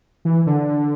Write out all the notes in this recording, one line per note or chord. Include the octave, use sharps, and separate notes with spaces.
E3
D3